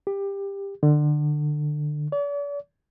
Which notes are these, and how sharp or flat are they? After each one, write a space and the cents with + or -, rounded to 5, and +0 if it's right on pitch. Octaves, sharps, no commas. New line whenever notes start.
G4 +20
D3 +25
D5 -45